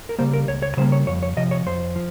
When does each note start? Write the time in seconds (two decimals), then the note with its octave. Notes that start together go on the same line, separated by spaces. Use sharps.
0.09 A#4
0.18 C#3 G3 A#3 C5
0.33 A#4
0.48 C#2 C#5
0.62 C#5
0.77 C#3 G3 A#3 C5
0.92 C#5
1.07 F2 C#5
1.23 C#5
1.37 C3 F3 D#5
1.51 C#5
1.66 F2 C5
1.96 F3